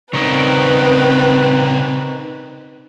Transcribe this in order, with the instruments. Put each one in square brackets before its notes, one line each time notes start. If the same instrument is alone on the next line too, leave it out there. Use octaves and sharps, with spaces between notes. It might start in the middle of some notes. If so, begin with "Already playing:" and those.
[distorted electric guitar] C#3 G3 [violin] C4 B4 [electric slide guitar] D#4 A#4 C#5